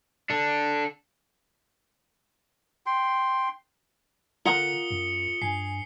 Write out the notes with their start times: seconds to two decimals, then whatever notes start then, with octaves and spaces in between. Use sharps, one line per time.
0.30 D4 A4
2.86 G5 C6
4.45 D3 F4 A#4 F#5 A#5 D#6 C#7 G7
4.91 F#2
5.42 G2 G#5 C7